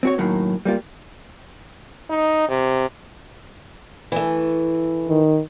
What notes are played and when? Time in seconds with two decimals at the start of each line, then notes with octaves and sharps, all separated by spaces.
0.03 C4 F#4 C#5
0.18 F#2 A2 D#3 F#3 A#3
0.65 G3 A#3 F4
2.10 D#4
2.49 C3
4.12 E3 A3
5.09 D#3